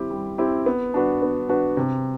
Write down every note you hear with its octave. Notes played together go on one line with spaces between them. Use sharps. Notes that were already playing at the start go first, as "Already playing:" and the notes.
Already playing: G3 C4 E4 G4
G3
C4 E4 G4
B3
D4 F#4 B4
B3
D4 F#4 B4
C3